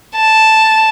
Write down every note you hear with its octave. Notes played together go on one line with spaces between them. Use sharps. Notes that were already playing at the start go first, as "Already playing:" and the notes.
A5